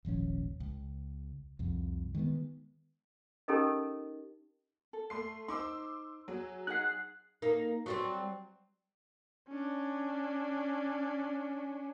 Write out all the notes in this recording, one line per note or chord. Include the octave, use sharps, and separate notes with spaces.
D#1 G#1 F3 C#4
C#2
C2 F2
D#3 G#3 A3 B3
C#4 D#4 G4 A4 A#4 D#5
A4
A3 C6 C7
D#4 C5 C6 D6 E6
F#3 G#4
D#4 G#4 F#5 F#6 C7
A#3 D#4
F#3 G3 C4
C#4 D4